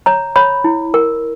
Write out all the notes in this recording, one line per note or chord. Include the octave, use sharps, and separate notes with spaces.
C#5 A#5
C#5 B5
E4
A#4